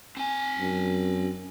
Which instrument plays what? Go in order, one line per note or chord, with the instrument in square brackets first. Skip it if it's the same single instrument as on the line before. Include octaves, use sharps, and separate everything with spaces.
[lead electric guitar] C4 G#5
[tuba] F#2